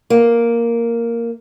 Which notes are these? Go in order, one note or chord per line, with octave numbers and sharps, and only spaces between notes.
A#3